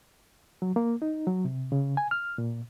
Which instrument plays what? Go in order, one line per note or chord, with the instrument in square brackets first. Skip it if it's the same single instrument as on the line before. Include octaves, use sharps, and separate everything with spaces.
[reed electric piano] F#3
A#3
D#4
F#3
C3
C#3
G#5
F6
A#2